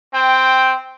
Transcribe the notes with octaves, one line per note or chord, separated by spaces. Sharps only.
C4 G5